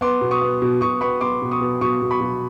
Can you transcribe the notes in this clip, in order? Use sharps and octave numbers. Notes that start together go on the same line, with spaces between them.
B3 C6 D6
B2
C#6 D#6
B3
B2
B2 C#6 D#6
B3 B5 C#6
B3 C6 D6
B2
C#6 D#6
B2
B2 C#6 D#6
B2
B5 C#6
B2